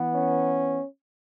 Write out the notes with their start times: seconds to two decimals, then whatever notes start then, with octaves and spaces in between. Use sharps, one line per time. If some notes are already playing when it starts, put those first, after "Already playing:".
Already playing: E3 B3
0.13 C#4